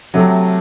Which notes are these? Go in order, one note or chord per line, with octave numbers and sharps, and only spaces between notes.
C3 F#3 A3